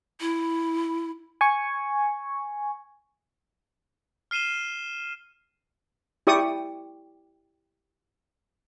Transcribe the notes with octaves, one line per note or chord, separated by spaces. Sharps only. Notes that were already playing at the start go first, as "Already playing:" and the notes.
E4
G#5 C#6
F6 C7 D#7 E7 G7
E4 G4 D5 C#6 D#6